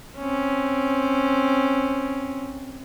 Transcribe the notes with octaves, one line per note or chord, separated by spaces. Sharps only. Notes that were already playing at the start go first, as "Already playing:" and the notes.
C4 C#4